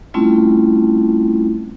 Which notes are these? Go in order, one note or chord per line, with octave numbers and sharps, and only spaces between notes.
G3 A3 C4 C#4 E4 F4